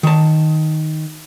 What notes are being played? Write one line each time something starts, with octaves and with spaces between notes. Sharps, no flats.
D#3 A5